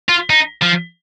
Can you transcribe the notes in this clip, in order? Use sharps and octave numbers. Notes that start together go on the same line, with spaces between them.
F4
D#4
F3